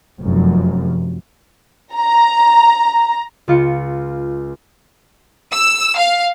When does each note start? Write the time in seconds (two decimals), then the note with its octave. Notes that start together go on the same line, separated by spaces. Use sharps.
0.20 F1 F#2
1.94 A#5
3.48 C#2 F4 C#7
5.52 E6
5.97 F5